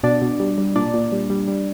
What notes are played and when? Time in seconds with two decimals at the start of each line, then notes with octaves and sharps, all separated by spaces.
0.03 B2 D4 D5
0.22 B2
0.40 G3
0.58 G3
0.76 A#2 D4 D5
0.94 A#2
1.12 G3
1.30 G3
1.48 G3